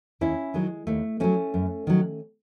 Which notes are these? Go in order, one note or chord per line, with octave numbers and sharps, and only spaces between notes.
D#2 C#4 E4
D#3 F#3 G#3
D#2 A3
D#3 F#3 A3 C#4
F#2
D#3 F#3